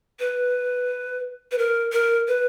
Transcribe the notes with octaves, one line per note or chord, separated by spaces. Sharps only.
B4
B4
A#4
A#4
B4